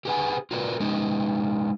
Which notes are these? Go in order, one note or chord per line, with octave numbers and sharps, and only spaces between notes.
G4 G#4 B4 C5 F#5 G#5
F4 F#4 A#4 B4 D5
G#3 C#4 D#4 G4